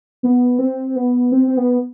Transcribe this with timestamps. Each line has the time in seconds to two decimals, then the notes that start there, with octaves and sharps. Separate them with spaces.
0.23 B3
0.59 C4
0.96 B3
1.32 C4
1.47 C4
1.57 B3